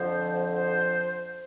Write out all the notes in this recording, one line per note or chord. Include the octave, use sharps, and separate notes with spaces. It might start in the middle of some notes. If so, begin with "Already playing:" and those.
Already playing: F2 D3 F3 C5
C5